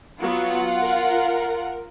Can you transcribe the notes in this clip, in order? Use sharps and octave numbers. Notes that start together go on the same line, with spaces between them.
F#3 B3 F4 F#5
A#4